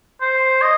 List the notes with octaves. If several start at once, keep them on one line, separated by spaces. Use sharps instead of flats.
C5
D#5